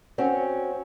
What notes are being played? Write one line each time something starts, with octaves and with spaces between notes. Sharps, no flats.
C4 C#4 F#4